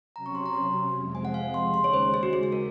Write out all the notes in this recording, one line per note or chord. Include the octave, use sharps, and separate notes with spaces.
C3 F#3 C#4 A#5
C#6
C6
A#5
C6
F2 C3 F3 G#3
G#5
F#5
F5
C6
D#2 C#3 G#3 C6
C#5
C5
G#4
F#4
G#4
G#4
A#4